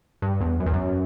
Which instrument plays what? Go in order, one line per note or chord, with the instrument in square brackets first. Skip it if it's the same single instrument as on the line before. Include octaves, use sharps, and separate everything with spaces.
[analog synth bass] G2
E2
F#2
E2
F#2